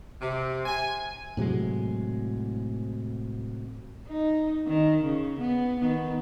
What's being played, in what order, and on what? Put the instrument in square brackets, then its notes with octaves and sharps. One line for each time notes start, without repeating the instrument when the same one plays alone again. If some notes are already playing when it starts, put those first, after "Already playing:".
[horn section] C3
G#5
[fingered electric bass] A2 C3 F#3 G#3
[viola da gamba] D#4
D#3
C#3
B3
D#3 B3